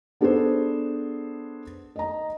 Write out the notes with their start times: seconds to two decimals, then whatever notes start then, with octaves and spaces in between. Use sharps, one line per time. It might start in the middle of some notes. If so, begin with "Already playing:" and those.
0.21 B3 D4 G#4 A4 B4 C5
1.96 D#5 A#5